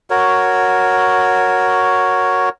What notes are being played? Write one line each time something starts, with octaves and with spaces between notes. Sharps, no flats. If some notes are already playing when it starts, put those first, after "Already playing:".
F#4 A#4 C#5